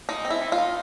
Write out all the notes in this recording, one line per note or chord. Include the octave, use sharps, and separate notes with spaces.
G#3 D#4
C4
E4
D#3
F4
D#4